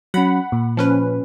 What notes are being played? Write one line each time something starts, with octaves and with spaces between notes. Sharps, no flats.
F#3 C#4 F#5 B5
A#2
F3 C#4 B4